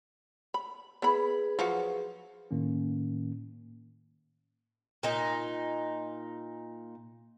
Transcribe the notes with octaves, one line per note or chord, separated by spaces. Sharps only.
B5
B3 E4 G#4 B4 B5
F3 F#3 F#4
A2 D#3 A#3 C#4
A#2 D#4